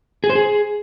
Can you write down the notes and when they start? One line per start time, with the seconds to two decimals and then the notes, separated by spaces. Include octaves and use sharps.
0.24 G#4
0.30 C5
0.35 G#4